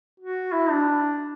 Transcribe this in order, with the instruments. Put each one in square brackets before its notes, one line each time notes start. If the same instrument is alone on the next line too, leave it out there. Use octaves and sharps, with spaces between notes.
[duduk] F#4
E4
D4